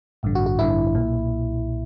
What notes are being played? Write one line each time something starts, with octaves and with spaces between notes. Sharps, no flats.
A1 G2 D3
F#4
F#4
A1 G2 D3 E4
B1 A#2